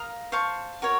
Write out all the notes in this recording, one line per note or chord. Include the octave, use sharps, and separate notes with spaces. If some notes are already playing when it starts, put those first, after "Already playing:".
Already playing: A#4 F5 A#5 D#6
C5 F5 A5 C#6
F#4 A#4 C#5